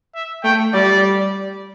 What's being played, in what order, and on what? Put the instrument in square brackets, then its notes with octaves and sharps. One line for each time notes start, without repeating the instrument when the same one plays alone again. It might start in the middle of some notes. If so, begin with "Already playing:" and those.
[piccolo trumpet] E5
[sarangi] A3 [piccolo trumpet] G5
[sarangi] G3 [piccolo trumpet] D5